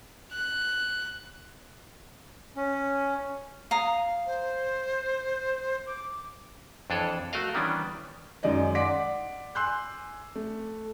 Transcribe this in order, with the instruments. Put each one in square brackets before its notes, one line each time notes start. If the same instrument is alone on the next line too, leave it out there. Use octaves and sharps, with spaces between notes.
[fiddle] F#6
[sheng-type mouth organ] C#4
[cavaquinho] F5 A#5 D#6
[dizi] C5
D6
[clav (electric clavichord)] F2 E3 D4 G#4 A4 C#5
A3 F#4 A#4 D#5 F5
D#3 E3 G3 B3 C#4 D4
[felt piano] F#2 D#3 G#3 D#4 D5 D#5
D5 F#5 C6 D6 B6 D7
G#5 C6 E6 F#6 G6
A3